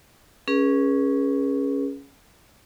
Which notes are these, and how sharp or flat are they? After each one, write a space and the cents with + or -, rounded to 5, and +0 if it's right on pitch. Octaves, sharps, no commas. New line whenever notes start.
C#4 +0 G#4 +0 B4 -40